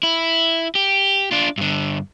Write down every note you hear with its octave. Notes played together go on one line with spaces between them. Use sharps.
E4
G4
D4 F4
G2 D3